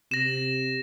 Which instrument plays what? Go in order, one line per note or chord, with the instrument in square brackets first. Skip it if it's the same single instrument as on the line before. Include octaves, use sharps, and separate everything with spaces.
[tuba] C3 [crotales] A#6 E7